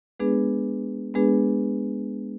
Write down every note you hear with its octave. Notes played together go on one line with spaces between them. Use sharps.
G#3 B3 D4 G#4 B4
G#3 B3 D4 G#4 B4